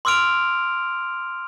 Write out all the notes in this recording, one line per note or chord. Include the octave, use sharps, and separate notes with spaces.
C6 D6 E6 F6 D7 F7